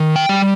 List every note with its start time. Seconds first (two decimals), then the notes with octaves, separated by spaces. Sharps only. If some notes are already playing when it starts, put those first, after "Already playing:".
Already playing: D#3
0.16 G5
0.29 G3